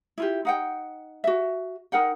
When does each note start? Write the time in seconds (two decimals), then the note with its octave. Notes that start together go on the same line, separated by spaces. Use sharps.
0.18 E4 F4 G4
0.45 D#4 F#5 G5
1.24 F#4 E5
1.92 D#4 A#4 F#5 G5